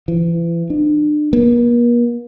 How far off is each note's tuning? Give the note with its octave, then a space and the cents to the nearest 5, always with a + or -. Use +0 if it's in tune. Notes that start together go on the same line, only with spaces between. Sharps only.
E3 +35
D4 +35
A#3 +45